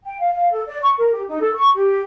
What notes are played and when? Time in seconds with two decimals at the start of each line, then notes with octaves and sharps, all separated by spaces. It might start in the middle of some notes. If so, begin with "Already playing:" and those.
0.04 G5
0.20 F5
0.33 F5
0.51 A4
0.66 D5
0.82 C#6
0.98 A#4
1.12 G4
1.29 D#4
1.41 A4
1.54 C#6
1.75 G4